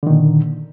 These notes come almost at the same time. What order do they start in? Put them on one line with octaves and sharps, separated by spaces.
D3 D#3 A#2